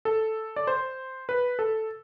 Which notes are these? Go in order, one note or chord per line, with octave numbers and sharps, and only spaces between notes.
A4
D5
C5
B4
A4